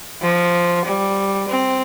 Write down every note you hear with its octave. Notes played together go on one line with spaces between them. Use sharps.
F3
G3
C4